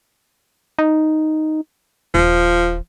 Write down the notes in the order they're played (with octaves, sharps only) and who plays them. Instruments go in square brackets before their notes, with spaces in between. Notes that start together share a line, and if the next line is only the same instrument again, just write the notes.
[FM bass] D#4
[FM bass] D#1 [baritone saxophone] F3